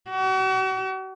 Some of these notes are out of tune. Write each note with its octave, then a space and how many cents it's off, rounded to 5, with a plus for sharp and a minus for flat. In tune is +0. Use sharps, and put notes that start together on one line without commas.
F#4 +40